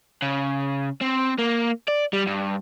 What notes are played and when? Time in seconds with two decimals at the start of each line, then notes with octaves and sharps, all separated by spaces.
0.22 C#3
1.01 C4
1.38 A#3
1.88 D5
2.13 G3
2.27 G2